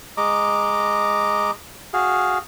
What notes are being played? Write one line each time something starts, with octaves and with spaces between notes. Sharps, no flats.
G#3 D#5 A#5 D6
F#4 G#4 F5